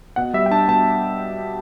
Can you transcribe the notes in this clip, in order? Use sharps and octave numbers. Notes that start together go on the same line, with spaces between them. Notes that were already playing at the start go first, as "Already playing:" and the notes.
B2 F#5
G3 E5
G5
D4 A5
B2 A5